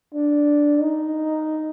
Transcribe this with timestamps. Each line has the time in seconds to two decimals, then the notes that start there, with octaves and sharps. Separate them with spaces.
0.14 D4
0.81 D#4